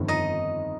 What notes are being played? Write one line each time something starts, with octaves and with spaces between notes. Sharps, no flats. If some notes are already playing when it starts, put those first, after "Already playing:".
Already playing: G1 F2 D#3
D#4 D#5